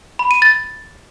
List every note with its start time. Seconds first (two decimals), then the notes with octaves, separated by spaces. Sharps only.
0.19 B5
0.31 D#7
0.42 A6